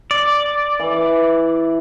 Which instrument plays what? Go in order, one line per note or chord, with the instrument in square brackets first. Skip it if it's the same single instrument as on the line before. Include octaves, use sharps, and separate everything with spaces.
[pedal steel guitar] D5
[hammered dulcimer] E3